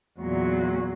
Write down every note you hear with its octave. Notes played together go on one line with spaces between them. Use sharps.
E2 A#2 F#3